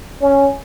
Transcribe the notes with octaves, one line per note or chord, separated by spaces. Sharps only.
C#4